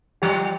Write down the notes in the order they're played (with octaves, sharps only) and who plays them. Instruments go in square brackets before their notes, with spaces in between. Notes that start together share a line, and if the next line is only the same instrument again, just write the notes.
[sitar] F3 G3 [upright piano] G4